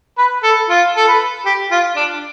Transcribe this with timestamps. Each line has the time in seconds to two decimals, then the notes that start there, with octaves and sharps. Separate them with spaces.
0.18 B4
0.43 A4
0.69 F4
0.96 A4
1.08 B4
1.46 G4
1.71 F4
1.96 D4